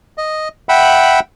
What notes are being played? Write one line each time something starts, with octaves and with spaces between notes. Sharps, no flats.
D#5
E5 F#5 G5 B5